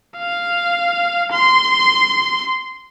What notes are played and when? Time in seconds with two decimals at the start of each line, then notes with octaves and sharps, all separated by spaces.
0.18 F5
1.33 C6